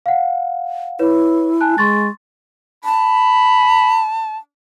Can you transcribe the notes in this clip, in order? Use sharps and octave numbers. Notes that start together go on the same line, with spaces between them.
F5 F#5
E4 B4 C#5
G#5 A5 F#6
G#3 C6 C#6 A6
A5 B5